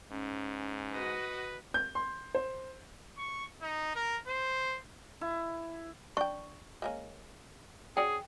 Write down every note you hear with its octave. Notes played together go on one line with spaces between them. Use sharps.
G#2 C#4
F#4 B4 D#5
G6
C6
C5
C#6
D#4
A#4
C5
E4
D4 G5 C#6
G#3 A#3 C#4
C#4 F#4 G#4 D5 G5